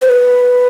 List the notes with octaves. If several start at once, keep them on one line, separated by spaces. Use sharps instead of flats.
C5
B4